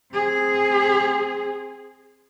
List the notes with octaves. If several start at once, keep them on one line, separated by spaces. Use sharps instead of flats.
C4 G#4